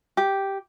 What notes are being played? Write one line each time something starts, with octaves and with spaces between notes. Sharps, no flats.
G4